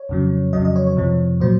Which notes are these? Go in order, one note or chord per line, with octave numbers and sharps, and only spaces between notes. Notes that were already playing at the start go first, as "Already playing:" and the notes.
Already playing: C#5
F2 C#3 F#3
F2 C#3 F#3 D#5
D#5
C#5
C#5
F2 C3 F3
A#2 F#3 C5